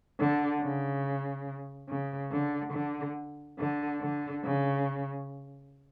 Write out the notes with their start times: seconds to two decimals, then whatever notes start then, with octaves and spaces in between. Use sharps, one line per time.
0.19 D3
0.61 C#3
1.89 C#3
2.32 D3
2.73 D3
3.59 D3
4.01 D3
4.44 C#3